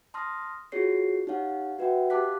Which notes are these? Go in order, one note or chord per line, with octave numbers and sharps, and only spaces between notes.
A5 C6 D#6 F6 A#6
F4 F#4 G#4 C#5 C7
D#4 G4 C#5 F5 F#5
F#4 B4 E5 F#5 G5
G4 F5 A5 D6 F#6 B6